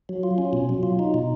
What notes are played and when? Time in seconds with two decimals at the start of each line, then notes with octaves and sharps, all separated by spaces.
0.09 F#3
0.23 F4
0.38 C#4
0.53 B2
0.69 F#3
0.83 F4
0.99 D#4
1.14 B2